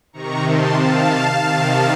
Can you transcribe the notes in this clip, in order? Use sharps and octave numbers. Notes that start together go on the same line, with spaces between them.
C3 D#3 A#5 C#6
A5 C6
F5 A5
C3 D#3